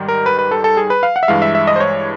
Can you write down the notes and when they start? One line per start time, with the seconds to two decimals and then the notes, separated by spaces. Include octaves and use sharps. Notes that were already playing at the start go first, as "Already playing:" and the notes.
Already playing: G#2 D#3 G3
0.08 A#4
0.26 B4
0.39 B4
0.51 A4
0.64 A4
0.77 G#4
0.90 B4
1.03 F5
1.16 F#5
1.23 E5
1.28 G2 E3 G#3 F5
1.42 E5
1.55 E5
1.67 D#5
1.76 C5
1.80 C#5